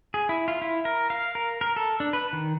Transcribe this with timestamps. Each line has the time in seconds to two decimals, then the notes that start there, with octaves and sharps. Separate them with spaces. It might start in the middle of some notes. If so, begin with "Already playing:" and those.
0.14 G#4
0.29 E4
0.48 F4
0.62 E4
0.85 A#4
1.10 F5
1.35 A#4
1.61 A#4
1.76 A4
2.00 D4
2.13 B4
2.33 D#3